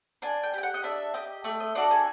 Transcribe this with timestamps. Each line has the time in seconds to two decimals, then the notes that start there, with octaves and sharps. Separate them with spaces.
0.22 D4 G#5
0.43 G5
0.54 G4 G5
0.63 F#5
0.74 D#5
0.83 D4 E5
1.14 G4 D#5
1.44 A3 D5
1.60 D#5
1.75 D4 F#4 A4 D5
1.91 G#5